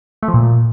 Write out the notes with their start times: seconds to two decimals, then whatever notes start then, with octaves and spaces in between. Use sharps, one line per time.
0.23 A3
0.28 F3
0.34 A#2